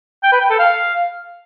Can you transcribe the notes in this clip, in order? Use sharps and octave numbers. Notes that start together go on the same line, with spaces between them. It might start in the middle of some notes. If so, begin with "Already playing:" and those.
G5
B4
G5
A4
F5